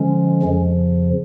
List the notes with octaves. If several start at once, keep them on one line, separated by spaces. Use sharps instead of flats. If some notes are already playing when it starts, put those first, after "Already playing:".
Already playing: D3 F3 G#3 C#4
F2 C#3 F3